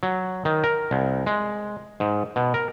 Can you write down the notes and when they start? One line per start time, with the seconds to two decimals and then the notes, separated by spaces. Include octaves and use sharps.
0.03 F#3
0.45 D#3
0.64 A#4
0.91 C2
1.26 G#3
2.00 G#2
2.36 B2
2.54 A#4